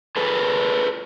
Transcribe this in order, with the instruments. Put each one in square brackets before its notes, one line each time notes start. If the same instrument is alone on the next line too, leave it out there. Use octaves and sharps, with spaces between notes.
[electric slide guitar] G#4 A4 B4 A5